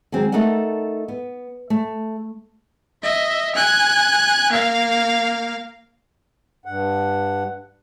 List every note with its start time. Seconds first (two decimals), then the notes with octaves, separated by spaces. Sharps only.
0.12 D#3 F#3 G#3 C4
0.32 A3 D#4 A4 A#4 D#5 F#5
1.08 B3
1.70 A3
3.03 D#5 E5
3.55 G#5 F#6
4.52 A#3 F5
6.66 G2 F#5